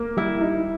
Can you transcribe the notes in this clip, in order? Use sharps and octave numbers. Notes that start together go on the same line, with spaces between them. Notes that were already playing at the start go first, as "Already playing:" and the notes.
Already playing: A#3
G3 E4
D#4